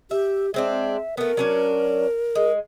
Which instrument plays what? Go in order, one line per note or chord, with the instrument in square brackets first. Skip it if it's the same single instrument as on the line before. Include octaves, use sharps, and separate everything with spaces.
[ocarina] G4 [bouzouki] E5
[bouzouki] G#3 C4 D4 [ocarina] E5
[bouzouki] A3 B3 [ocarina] A#4
[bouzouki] F#3 C#4 D4
G#3